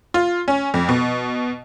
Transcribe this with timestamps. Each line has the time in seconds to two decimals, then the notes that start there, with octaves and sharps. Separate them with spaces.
0.14 F4
0.48 C#4
0.74 F2
0.89 B2